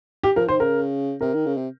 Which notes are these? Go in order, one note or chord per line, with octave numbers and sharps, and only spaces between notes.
G4
F3 A#4
D#3 C5
C#3 A#4
C3 A#4
D#3
C#3
C3